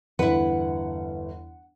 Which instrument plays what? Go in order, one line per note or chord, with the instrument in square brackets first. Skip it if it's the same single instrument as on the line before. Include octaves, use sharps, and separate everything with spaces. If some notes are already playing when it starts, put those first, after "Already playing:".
[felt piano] G1 [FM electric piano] E2 E3 [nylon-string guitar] E4 B4 [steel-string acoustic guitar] F#5